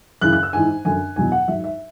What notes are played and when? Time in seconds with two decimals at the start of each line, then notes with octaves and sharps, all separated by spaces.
0.21 F#2 C#3 E3 F#6
0.33 F#6
0.43 E6
0.53 G#2 E3 G#5
0.85 F#2 D3 F#3 G#5
1.16 E2 B2 F#3 G#5
1.32 F#5
1.48 G#2 F#3 E5
1.64 E5